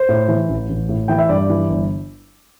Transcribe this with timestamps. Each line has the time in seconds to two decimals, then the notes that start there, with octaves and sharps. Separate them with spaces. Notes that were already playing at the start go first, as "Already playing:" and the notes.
Already playing: C5
0.09 A2
0.28 E3
0.49 A1
0.69 A1
0.89 A2
1.08 E3 G5
1.18 E5
1.29 G2 D5
1.50 E3
1.70 G1